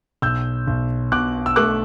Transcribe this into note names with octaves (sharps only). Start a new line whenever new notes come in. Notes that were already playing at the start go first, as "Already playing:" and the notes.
B1 E6 G6
B1
B2 D6 F#6
E6
A3 D6 F#6